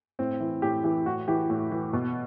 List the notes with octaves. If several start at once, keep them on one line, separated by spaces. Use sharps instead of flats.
A2 C4
E3
A2 G4
E3 G4
A2 F#4
E3 G4
A2
E3
B2